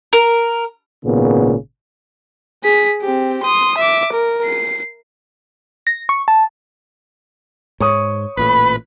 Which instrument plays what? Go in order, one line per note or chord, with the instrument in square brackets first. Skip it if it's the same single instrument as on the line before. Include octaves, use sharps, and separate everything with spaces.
[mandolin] A#4
[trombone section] G#1 A#2 C#3 B3
[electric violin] G#4 B6
C4 G4
C6 D#6
E5 D6
A#4
C7
[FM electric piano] A#6
C#6
A5
[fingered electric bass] G#2 [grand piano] C#5 C#6 D#6
[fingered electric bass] A1 A#2 A3 [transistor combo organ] B4 [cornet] B5